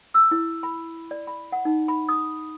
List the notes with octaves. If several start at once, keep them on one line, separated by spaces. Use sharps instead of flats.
E6
E4
B5
D5
B5
F#5
D#4
B5
D#6